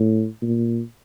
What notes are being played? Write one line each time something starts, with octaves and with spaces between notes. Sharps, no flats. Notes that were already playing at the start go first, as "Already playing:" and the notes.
Already playing: A2
A#2